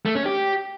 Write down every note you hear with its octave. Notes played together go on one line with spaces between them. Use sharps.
A3
C#4
G4